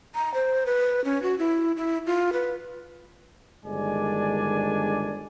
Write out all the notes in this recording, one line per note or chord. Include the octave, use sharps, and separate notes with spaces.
A#5
C5
B4
C#4
F#4
E4
E4
F4
B4
G1 D#3 G#3 D4 D5 G#5